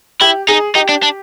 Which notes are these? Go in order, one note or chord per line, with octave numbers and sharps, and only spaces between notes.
E4 G4
D#4 G#4
D#4 G4
D4
D4